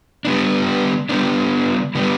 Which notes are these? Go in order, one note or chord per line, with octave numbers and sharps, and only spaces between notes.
D3 G3 B3 D4
D3 G3 B3 D4
D3 G3 B3 D4